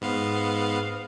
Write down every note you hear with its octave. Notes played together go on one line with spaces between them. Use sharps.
G#2 B3 F5